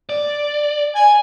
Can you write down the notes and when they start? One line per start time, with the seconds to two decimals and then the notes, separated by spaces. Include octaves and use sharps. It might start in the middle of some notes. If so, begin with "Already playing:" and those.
0.09 D5
0.95 G#5